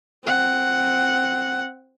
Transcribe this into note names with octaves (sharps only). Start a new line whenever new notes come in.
C4 F#5